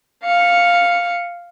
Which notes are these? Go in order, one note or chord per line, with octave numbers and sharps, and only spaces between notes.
F5 C#7